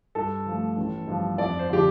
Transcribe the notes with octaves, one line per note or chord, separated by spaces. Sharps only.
G2 A4
F3 A3
A1
G2 F3
F2 D5
C5
D3 F3 G4